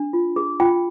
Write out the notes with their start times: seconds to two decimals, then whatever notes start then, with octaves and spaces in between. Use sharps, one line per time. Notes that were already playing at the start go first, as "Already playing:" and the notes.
Already playing: D4
0.13 F4
0.36 G#4
0.60 F4 G5